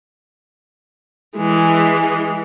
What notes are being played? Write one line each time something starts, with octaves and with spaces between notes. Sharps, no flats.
E3 G#3